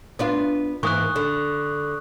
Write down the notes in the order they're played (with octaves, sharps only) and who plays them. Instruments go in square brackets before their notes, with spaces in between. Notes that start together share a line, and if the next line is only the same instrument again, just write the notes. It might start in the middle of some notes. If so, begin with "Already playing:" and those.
[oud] B3 D4 F4
[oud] G#2 E3 A#3 [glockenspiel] C#6 D#6 F#6
[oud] D3